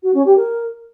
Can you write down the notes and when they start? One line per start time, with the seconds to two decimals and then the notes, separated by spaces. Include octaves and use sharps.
0.02 F#4
0.14 C#4
0.25 G4
0.37 A#4